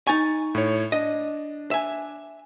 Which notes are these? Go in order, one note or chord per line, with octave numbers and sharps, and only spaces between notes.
D#4 G#5 C#6 A6
A2 C#5
D4 D#5
E5 G#5